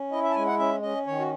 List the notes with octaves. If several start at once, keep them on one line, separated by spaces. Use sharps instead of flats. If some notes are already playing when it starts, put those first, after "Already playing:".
Already playing: C#4
E4 D#5
E5
A5
G#3 G#5
F#5
C#4 E5
C#4 D#5
D#3 C#5
F#4